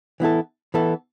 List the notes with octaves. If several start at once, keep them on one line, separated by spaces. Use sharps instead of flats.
E3 B3 E4 A4
E3 B3 E4 A4